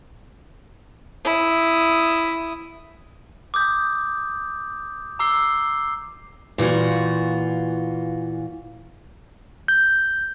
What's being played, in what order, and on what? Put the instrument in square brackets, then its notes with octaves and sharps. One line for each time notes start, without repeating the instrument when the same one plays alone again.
[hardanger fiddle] E4 D#6
[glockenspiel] D6 D#6 G6
A#5 D6 E6 C7 G7
[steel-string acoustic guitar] A#2 E3 F4 F#4
[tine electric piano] G6